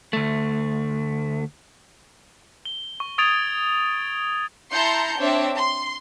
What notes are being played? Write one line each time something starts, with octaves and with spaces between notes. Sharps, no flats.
D2 A3
G7
C#6
C#6 D#6 G#6 A6 D7 F7
E4 A5 A#5 C6 G6 C#7
C4 D4 C#5 E5
C6